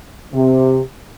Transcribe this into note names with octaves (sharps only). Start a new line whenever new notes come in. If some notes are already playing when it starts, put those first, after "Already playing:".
C3